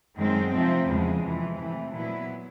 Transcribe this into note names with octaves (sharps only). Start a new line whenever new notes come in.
F#2 D#3 G#3 C4
C3 F3 A3 C4
E2 C#3 F3 G#3
F2 C3 E3
C3 E3 A3
A#2 F#3 B3 E4